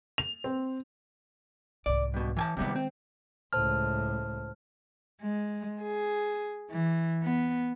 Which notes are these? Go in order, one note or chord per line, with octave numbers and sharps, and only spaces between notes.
F7
C4
C2 G#2 D5
G2 B2
E3 G#5 A5
C3 D#3 G3 G#3 B3
C4
C#2 A2 C5 A5 F6
G#3
G#4
E3
B3